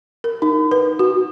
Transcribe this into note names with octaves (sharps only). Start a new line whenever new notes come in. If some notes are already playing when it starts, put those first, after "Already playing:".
A#4
D#4
B4
F#4